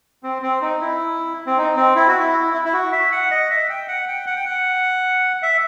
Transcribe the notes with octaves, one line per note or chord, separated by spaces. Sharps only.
C4
C4
D#4
E4
C4
D#4
C4
E4
F#4
E4
E4
E4
F#4
E5
F#5
D#5
E5
G5
F#5
G5
F#5
G5
F#5
E5